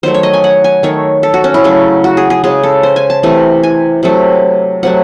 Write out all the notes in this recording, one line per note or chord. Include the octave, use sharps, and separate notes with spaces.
D#3 F#3 A3 C5
C#5
D#5
G#5
F#5
G#5
D#3 A3 C#5
A4
F#4
C#4
E4
C#3 F#3 A3
F#4
G#4
G#4
C#3 G#3 G#4
A4
C5
G#5
A5
C3 E3 A3
G#5
C3 F#3 A3
C3 F#3 A3 F#5